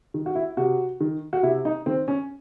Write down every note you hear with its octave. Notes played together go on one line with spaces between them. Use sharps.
D#3
F#4
E4
C3 F#4
D#3
F#4
C3 E4
D#4
D#3 C4
C#4